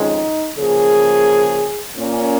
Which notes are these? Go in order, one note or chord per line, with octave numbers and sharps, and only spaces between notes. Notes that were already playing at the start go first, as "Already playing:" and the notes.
Already playing: F2 D#3 G#3 C#4 D#4
C#3 F3 A#3 G#4
A#2 A#3 C#4